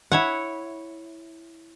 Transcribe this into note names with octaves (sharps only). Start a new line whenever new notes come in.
E4 C#5 F#5